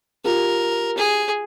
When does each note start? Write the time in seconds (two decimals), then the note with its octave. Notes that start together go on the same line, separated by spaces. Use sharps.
0.24 F4 G4 A#4
0.98 G#4